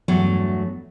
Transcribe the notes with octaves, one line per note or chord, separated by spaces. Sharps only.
E2 G2 F#3 A3